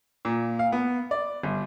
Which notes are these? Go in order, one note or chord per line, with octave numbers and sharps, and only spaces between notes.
A#2
F5
B3
D5
G1